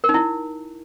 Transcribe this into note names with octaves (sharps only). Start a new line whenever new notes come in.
A#4
D#4
E4